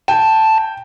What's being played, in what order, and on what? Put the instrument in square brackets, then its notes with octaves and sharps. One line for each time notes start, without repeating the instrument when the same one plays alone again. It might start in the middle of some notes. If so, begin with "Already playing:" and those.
[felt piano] G5 [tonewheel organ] A5